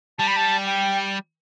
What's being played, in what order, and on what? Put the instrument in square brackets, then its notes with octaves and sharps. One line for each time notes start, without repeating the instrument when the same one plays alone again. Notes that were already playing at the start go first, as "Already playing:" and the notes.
[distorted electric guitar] G3 [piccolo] A5
[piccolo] B5
A5
G5